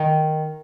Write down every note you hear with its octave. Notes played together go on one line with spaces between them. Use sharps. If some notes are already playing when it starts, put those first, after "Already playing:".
Already playing: D#3